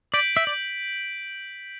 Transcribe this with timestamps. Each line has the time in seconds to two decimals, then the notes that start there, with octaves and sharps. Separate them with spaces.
0.14 D5 G6 B6 D7 F#7
0.37 E5
0.47 D5